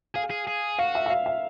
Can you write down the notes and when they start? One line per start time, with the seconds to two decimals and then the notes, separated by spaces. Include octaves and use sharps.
0.15 G#4 F5
0.30 G#4
0.47 G#4
0.79 F#4 F5
0.95 E5
1.06 E5
1.10 F5
1.26 E5